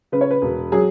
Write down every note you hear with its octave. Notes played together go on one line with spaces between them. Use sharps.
C#3 B4
C#5
B4
E1
F#3 G#4